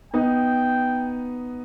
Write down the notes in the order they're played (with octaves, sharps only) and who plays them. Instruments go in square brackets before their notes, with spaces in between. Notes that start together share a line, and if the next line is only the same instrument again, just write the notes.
[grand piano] B3 D#4 [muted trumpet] G5